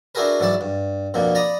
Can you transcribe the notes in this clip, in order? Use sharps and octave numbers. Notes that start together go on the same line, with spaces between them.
D4 E4 F#4 G#4 A#4 B4
G#2 E3 F#3 D5 A5
G2
F2 B2 D3 A#3
D5 A#5 B5 D#6